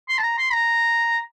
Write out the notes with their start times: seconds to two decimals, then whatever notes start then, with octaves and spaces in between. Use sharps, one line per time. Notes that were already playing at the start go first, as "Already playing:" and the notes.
0.09 C6
0.18 A5
0.23 A#5
0.38 C6
0.53 A#5